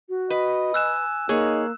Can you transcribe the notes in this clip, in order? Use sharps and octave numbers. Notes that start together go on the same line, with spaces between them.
F#4
B4 D#5
G#5 E6 F#6 E7
A#3 D#4 G#4 C#5